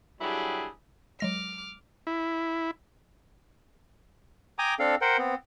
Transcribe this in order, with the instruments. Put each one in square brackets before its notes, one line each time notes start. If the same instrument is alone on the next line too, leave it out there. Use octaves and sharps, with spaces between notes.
[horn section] D3 F#3 G3 E4 G4 G#4
[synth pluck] F#3 G#3 A#6 [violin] D6 F6
[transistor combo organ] E4
[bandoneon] G5 G#5 A#5 D6 D#6
C4 D4 A4 F5
A#4 C5 F#5 G5
B3 C4